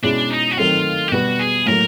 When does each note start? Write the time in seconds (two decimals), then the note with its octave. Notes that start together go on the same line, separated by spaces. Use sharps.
0.03 B2 G#3 C#4 D4 E4
0.30 D#4
0.51 F#4
0.57 D#3 F#3 A3 C4 F4
1.08 G4
1.12 B2 G3 B3 F#4
1.39 G#4
1.66 A2 F#3 A#3 A#4